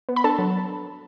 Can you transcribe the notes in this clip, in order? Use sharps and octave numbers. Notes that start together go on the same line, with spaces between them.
B3
B5
D4 A4 A5
F#3